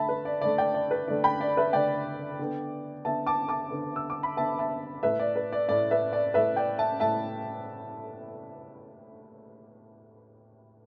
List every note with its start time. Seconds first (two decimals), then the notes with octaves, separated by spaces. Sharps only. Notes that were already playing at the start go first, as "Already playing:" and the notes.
Already playing: D3 A3 E5 A5 B5
0.09 B4
0.25 D5
0.41 D3 A3 D5
0.58 D5 G5
0.74 D5
0.91 B4
1.08 D3 A3 D5
1.24 G5 B5
1.41 D5
1.57 B4 E5
1.73 D3 A3 D5 G5
2.39 D3 B3
3.05 D3 B3 E5 A5
3.27 A5 D6
3.49 A5 D6
3.71 D3 B3
3.96 E6
4.10 D6
4.23 B5
4.36 D3 B3 E5 A5
4.59 E5 A5
5.03 A2 A3 B4 E5
5.19 D5
5.36 B4
5.52 D5
5.68 A2 A3 D5
5.91 B4 E5
6.13 D5
6.34 A2 A3 B4 E5
6.56 D5 G5
6.78 E5 A5
7.00 A2 A3 E5 A5